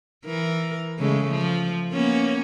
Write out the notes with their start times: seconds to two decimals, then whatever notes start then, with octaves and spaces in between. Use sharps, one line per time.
0.25 E3 A#4
0.98 C#3 G#3 A3
1.30 F3
1.93 A#3 B3 C#4